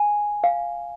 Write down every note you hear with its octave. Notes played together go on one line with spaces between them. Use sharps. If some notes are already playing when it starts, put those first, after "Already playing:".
Already playing: G#5
F5